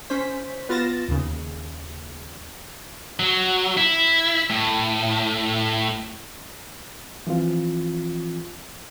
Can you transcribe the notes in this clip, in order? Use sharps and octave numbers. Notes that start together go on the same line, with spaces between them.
C#4 C5 B6
B3 F4 A6 A#6 E7
D#2 C#3
F#3
E4
A2
E3 F3 C4 F4